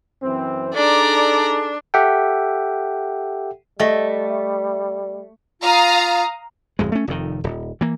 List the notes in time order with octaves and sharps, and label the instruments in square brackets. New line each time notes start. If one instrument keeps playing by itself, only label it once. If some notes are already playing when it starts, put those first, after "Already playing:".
[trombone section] F#2 E3 C4
[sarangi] D4 [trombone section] D#4 G#4 A4 [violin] D5 A#5
[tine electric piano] G4 A4 E5 F#5 G5
[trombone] G3 [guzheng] A3 [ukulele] D#5 G5
[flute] F4 [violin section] F5 A#5 D#6
[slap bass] D1 F2 G#3
A3 C#4
F1 F2 D#3
D#1
E3 A#3